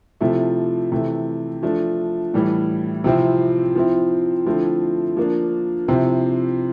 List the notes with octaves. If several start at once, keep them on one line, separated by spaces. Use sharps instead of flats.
C3 F3 A3 E4
C3 E3 A3 E4
F3 A3 D4
A2 E3 G3
C3 F3 C4 E4
F3 C4 E4
D3 F3 A3 C4 E4
F3 A#3 D4
C3 F3 C4 E4